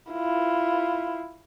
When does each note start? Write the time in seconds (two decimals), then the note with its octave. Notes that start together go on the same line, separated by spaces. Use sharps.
0.12 E4 F4